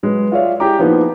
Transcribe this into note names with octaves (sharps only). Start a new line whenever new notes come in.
F#3 G#3 B4
F4 G#4 C#5 D5 E5 F5
E4 G4 G#4 G5 A#5 D6
F3 A#3 B3 D#4 E4